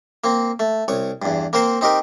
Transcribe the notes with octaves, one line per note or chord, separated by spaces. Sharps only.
A#3 C4
A3
C2 C#5
E2 G2
A#3 C4 A#4 C5
C4 D#4 G4 A#4